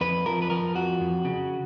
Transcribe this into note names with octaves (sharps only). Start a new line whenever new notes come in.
F2 B4
F3 A#4
B4
F3 A#4
F2 F#4
F2
C#3